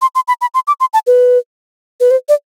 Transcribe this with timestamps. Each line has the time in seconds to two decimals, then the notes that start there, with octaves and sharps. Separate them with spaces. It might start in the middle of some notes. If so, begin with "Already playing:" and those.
0.02 C6
0.15 C6
0.28 B5
0.41 B5
0.54 C6
0.67 D6
0.80 C6
0.94 A5
1.07 B4
2.00 B4
2.11 C5
2.29 D5